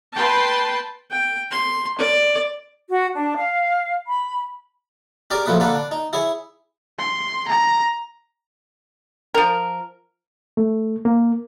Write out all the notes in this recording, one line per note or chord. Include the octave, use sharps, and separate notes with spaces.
B4 G5 A5 C6
G5
C6
D5
F#4
D4
F5
B5
C#4 G4 G#4 A#4 D5
A#1 F#2 F3 A3 B4 D#6
D3 A#3 D4 A4 B4
D4
D#4
E4 G#4 C#5 G#5
C6
A#5
F3 A#4
A3
A#3